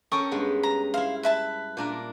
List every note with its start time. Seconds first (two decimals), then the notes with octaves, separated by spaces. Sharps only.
0.12 C#4 A4 A#4 G5 C#6 D#6
0.31 G2 G#3 B3
0.63 A#5
0.94 E4 F5 C6
1.23 B4 E5 A5
1.77 A#2 D4 A#4